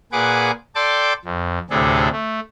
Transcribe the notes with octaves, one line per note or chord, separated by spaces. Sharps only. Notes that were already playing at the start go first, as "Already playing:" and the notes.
A#2 G#4 B4 F#5 G#5 D6
A4 D5 G5 A5 C6 D6
F2
D2 A2 C3 D4 G#4 A4
A3